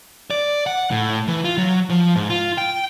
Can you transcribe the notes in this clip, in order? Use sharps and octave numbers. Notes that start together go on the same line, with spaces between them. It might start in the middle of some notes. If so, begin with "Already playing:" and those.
D5
F#5
A2
E3
F4
F#3
F3
G#2
F4
G5